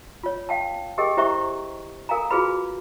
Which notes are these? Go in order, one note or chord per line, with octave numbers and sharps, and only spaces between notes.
F4 C#5
F5 G5 A5
G4 G#4 A#4 D#5 G5
E4 G4 C5 E5 A#5 C#6
A4 A#4 F5 G#5 A#5
F4 F#4 G#4 B4 B5